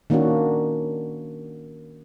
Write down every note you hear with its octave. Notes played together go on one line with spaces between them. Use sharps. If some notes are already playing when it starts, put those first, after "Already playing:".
D#3 A#3 C#4 D4 F#4